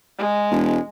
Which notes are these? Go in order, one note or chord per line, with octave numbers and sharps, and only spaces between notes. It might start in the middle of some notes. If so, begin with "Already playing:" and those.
G#3
E1